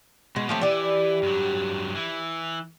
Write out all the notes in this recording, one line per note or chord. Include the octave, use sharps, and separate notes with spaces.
B2 G#3
F3 A3 C4 G4 C#5
E3 G4 D5
G2 F#3
E3